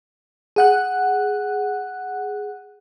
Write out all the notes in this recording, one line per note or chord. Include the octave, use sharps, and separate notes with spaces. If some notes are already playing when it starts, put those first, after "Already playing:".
G#4 F#5 F#6